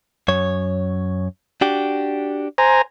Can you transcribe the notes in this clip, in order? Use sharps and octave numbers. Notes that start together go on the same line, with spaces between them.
F#2 C#5
D4 F#4 G4
C5 G#5 A#5